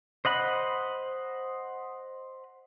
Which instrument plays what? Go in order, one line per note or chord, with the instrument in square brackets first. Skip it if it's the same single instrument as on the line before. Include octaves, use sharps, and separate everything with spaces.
[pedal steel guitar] C5 D#5 F#5 B5